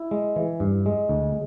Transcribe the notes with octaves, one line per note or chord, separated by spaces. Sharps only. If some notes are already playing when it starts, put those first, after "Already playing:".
Already playing: E4
G#3
E3
G2
G#3
D2